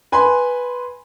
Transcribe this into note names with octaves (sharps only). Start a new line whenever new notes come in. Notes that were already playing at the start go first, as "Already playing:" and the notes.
B4 G#5 B5 C6